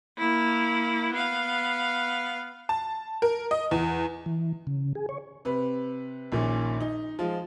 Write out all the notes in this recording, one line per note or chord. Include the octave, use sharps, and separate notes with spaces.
A#3 E4
B3 F5
A5
A#4
D#5
E2
E3
C#3
G#4
C#5
C3 B4
A#1 A#2 D#3 C#4
D#4
F3 G#3 F4